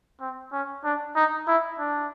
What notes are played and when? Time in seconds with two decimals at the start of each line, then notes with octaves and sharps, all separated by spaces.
0.21 C4
0.52 C#4
0.84 D4
1.16 D#4
1.47 E4
1.79 D4